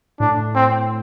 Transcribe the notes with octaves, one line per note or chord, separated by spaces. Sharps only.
A2 D4
C4